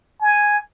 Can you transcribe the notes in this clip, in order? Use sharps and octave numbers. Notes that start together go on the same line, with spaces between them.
G#5